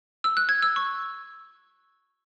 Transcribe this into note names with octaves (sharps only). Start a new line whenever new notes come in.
E6
F#6
G#6
E6
C#6